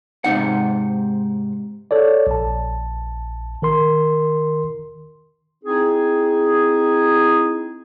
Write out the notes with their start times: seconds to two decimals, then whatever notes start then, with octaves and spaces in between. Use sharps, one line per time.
0.24 G#2 C3 D#4 F#5
1.91 A4 C#5 D5
2.27 A#1 A5
3.62 D#3 A#4 C6
5.64 C4 D#4 E4 G#4